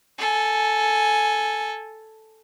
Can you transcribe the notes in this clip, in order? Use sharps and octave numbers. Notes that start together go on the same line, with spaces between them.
A4 G#5